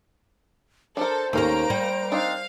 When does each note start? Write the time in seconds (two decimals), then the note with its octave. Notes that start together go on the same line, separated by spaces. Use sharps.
0.97 D4 A4 A#4 C5
1.33 D#2 A#3 C#4 A4 F5 A#5 D7
1.70 G3
2.12 C4 D4 D#4 F5